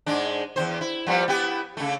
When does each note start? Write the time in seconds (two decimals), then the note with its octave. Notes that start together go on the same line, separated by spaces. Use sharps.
0.06 G#2 G#3 D4
0.56 E2 C#3 C5
0.81 E4
1.07 F3 G3 B3
1.28 B3 E4 G4
1.77 C#3 A3